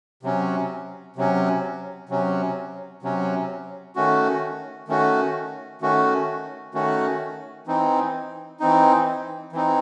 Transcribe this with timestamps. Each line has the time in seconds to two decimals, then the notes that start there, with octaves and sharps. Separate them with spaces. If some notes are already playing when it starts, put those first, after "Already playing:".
0.23 C3 F#3 C#4
1.16 C3 F#3 C#4
2.09 C3 F#3 C#4
3.03 C3 F#3 C#4
3.95 D#3 A3 C#4 F#4
4.88 D#3 A3 C#4 F#4
5.81 D#3 A3 C#4 F#4
6.74 D#3 A3 C#4 F#4
7.67 E3 C4 D#4
8.60 E3 C4 D#4
9.53 E3 C4 D#4